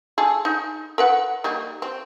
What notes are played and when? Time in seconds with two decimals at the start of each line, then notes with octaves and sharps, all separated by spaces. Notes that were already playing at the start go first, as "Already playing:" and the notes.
0.18 G#4 A4
0.45 D#4
0.98 A#4 B4 F#5
1.44 G3 A#3 D#4
1.82 C4